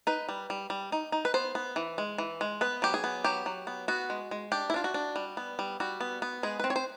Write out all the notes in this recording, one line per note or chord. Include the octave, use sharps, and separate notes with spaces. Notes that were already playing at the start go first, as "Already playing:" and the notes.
D#4 B4
G3
G3
G3
D#4
D#4
B4
B3 C5
B3
E3
G#3
E3
G#3
B3 B4
F#3 G4
G#4
B3
F#3 G4
F#3
B3
B3 F#4
G#3
G#3
D4 G4
E4
D4 F4
F#4
D4
G3
B3
G3
G3 F#4
B3
B3
G#3 G#4
C4 B4
C#5
C5